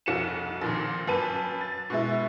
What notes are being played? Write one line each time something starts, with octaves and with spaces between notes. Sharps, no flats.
F1 C2 F#4 C#7 E7
A#1 A#2 D#3
F#2 B4 A5 D#7
A6
B2 G#3 E4